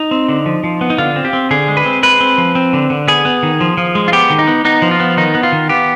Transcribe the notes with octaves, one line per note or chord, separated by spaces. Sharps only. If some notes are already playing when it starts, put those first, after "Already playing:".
Already playing: D#4
C4
D3
F3
F3
B3
D#4
D3 F4
C4
G4
C4
D3 G#4
G#3
B4
C4
G#3 B4
C4
F3
C4
D3
D3
B3 G#4
B3
D#3
F3
F3
G#3
F4
B3 G4
D#3
D#4
B3
B3 D#4
F3
F4
B3
D#3 D#4
B3
F4
D#3
B3 G4